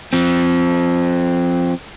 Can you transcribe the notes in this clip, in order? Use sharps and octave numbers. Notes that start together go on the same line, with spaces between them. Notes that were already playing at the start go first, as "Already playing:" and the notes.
F3 C4